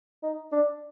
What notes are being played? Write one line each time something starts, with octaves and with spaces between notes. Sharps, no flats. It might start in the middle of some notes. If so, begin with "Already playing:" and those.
D#4
D4